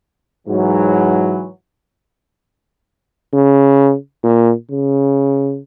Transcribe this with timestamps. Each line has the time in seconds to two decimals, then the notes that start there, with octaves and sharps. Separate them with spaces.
0.48 G#2 E3 F#3
3.33 C#3
4.24 A#2
4.71 C#3